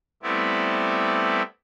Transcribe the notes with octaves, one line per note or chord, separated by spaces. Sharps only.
G3 A3 B3 C4 E4 D5